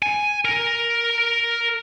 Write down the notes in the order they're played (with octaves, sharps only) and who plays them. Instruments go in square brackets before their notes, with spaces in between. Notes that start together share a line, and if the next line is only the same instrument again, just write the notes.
[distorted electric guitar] G#5
A#4